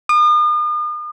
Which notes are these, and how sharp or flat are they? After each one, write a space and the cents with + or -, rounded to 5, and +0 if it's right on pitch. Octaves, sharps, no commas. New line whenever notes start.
D#6 -45